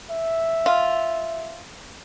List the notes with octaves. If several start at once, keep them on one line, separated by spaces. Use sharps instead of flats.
E5
F4